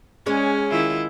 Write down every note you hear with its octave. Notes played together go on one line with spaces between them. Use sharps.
G#3 C#4 C#5
D#3 E4 F4